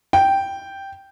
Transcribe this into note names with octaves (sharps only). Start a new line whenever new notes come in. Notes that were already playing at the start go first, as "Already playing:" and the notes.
G5